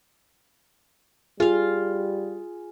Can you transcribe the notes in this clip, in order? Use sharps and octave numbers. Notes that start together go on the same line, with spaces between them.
G3 F4 G#4 F5